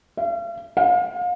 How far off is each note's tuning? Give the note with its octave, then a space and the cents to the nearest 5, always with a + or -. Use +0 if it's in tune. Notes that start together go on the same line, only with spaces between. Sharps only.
F5 -40
F5 +35